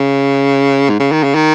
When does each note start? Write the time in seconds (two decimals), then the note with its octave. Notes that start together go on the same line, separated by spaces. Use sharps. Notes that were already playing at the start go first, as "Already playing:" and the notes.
Already playing: C#3
0.89 G#2
1.00 C#3
1.12 D#3
1.24 C#3
1.35 D#3